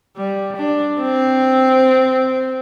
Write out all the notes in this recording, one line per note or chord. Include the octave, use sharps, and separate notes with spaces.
G3
D4
C4